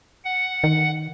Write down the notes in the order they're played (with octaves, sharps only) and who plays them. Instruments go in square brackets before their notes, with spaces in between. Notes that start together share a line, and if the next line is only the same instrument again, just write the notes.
[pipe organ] F#5
[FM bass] D#3